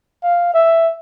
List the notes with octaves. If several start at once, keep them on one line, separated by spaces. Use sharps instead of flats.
F5
E5